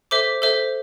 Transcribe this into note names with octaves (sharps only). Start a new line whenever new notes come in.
A4 C5 E5 D6
A4 C5 E5